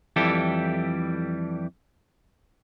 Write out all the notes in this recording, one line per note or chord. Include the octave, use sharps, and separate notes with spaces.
F2 E3 G3 E4 G4 A4